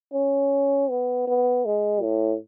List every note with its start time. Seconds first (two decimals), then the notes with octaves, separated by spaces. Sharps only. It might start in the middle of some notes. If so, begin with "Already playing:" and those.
0.13 C#4
0.90 B3
1.27 B3
1.65 G#3
2.02 A2